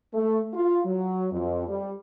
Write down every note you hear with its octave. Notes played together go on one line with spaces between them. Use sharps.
A3
F4
F#3
F2
G3